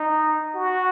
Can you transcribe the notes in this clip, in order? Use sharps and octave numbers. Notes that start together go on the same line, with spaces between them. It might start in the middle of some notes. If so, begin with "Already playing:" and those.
Already playing: D#4
F#4